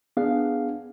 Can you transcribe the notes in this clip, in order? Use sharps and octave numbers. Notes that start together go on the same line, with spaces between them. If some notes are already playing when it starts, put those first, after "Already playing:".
B3 D4 G#4 F5